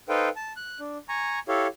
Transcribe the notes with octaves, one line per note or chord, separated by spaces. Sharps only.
D#4 A4 B4 C5 F5 G5
A5
F#6
D4
G#5 A#5 C#6
E4 G4 A4 C#5 F5